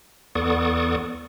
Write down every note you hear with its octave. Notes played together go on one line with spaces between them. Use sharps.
E2 B3 A4 D5 C#6 D#6